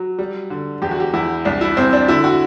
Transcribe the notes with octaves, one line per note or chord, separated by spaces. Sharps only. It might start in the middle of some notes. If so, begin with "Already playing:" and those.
Already playing: F#3
G3
D3
E2 G4
F#4
G4
E2 E4
C2 D4
E4
C2 C4
D4
D3 E4
F#4